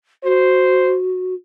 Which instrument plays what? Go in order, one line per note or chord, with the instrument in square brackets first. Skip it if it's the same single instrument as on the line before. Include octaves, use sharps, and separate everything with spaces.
[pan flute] F#4 [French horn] C5